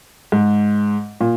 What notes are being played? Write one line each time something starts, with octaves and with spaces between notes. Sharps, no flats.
G#2
A#2